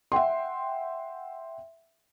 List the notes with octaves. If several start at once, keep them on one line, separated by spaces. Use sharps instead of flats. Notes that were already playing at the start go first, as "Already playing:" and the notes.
E5 F#5 G5 C6